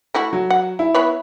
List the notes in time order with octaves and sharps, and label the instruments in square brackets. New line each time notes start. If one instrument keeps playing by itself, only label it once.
[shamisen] A3 E4 F#4
[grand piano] F#3
[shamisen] F#5
[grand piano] E4
[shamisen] B3 B4 C#5